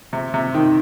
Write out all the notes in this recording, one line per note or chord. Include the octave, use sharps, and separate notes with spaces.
C3
C3
D#3